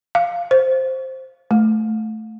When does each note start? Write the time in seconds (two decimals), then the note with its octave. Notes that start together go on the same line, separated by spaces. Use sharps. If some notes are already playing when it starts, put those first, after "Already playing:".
0.15 F5
0.51 C5
1.51 A3